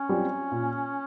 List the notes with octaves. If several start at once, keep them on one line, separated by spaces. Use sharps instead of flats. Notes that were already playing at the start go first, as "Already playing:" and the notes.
Already playing: C#4
G3 C4 F4
A#2